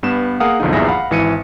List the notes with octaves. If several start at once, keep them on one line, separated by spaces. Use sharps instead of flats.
G2 B3 E7
A#3 G#4 A#4 F5 F#5 D#6
B1 F2 D3 D#4
A#1 E2 G2 G#4 E5 A#6
F5 F#5 B5
G#1 E3 C#7 D#7